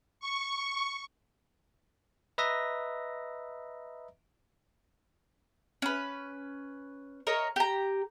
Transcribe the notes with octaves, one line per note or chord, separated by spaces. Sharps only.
C#6
B4 D#5 E5 A#5 A#6
C#4 B4
A#4 C#5 D#5
G4 A#5